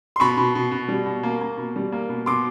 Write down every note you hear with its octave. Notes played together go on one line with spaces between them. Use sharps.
C6
B2 B5 C#6
B2
B2
B2
G3
B2
A#3
A#3
B2
G3
A#3
B2
B2 C6 D6